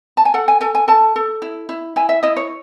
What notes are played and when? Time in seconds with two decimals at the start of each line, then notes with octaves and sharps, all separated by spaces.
0.17 A5
0.25 G#5
0.34 A4 F#5
0.48 G#5
0.61 A4 G#5
0.75 G#5
0.88 A4 A5
1.16 A4
1.42 E4
1.69 E4
1.96 E4 G#5
2.09 E5
2.23 E4 D#5
2.36 C#5